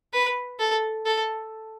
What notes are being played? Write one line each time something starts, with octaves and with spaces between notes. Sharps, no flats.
B4
A4
A4